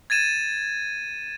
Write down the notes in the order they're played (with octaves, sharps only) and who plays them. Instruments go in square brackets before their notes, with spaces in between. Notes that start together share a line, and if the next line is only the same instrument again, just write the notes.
[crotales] G#6 A6 D#7 E7